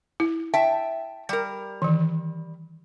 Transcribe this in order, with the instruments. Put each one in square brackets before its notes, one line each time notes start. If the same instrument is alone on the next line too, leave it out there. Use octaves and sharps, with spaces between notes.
[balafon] E4
[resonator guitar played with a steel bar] E5 G5 A5
G3 A#4
[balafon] D#3 E3